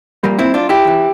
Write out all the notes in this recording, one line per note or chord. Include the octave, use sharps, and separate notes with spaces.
C2 A#2 G3 A#3
C4 E4
D4 F4
E4 G4
E2 E3